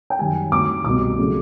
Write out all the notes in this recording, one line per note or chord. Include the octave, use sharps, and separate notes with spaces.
G5
F#2 D#3 G3 G#5
D2 C3 D#3 F#3 A3 D6
C2 B2 G3 D6
C#3 F#3 A3